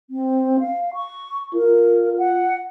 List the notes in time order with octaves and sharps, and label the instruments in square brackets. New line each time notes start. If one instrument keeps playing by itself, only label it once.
[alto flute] C4
F5
C#6
[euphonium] F4 [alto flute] A#4
[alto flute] F#5